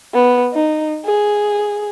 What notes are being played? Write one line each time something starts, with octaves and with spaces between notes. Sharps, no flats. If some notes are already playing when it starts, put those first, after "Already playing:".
B3
D#4
G#4